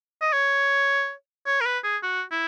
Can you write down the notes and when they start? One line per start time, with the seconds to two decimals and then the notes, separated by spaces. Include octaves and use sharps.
0.21 D#5
0.33 C#5
1.46 C#5
1.61 A#4
1.66 B4
1.84 G#4
2.03 F#4
2.32 E4